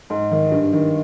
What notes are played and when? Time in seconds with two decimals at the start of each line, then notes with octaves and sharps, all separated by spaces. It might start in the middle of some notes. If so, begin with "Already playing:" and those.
0.10 G#2
0.31 D#3
0.51 G2
0.73 D#3